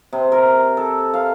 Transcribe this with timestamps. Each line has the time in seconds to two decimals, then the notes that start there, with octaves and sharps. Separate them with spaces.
0.13 C3
0.32 A#4
0.77 A4
1.14 F5